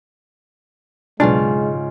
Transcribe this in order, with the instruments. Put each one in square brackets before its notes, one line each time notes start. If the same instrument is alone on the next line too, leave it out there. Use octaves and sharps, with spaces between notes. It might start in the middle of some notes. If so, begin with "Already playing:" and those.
[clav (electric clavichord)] B1 D4 [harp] G#2 C#3 F4 [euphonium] G#3